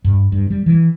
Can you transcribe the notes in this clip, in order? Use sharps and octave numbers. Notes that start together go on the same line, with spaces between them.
G2
G2
G3
E3